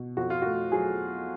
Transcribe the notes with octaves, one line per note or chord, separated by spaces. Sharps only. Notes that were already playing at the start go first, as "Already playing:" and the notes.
Already playing: B2
F2 F#4
F4
A3 F#4
F#3 G#4